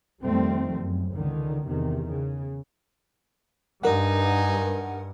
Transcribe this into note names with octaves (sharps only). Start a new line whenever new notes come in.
F2 D#3 F3 G3 A3 C4
F#2
C#2 D3 D#3
E2 C3 D#3
C#3
G2 D#4 A#4 F#5 G#5